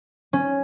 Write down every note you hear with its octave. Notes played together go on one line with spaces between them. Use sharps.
C#4